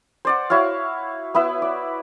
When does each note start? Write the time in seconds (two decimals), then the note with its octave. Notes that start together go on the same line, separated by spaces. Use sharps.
0.25 C5 D5 F#5
0.50 E4 F#4 C#5 F5
1.35 B3 E4 B4 E5
1.62 D5